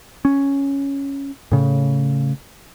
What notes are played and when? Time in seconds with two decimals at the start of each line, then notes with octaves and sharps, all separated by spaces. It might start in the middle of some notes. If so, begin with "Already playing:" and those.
0.25 C#4
1.52 A2 C#3